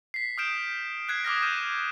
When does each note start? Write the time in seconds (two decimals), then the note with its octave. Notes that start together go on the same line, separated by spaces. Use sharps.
0.14 B6 C7
0.38 D#6 F6 G6 D7 E7
1.09 F#6 G#6 C7 D7
1.25 D6 D#6 F6 A#6
1.43 F6 G6 D#7 E7